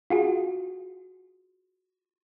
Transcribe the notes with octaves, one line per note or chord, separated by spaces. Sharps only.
F4 F#4 G#4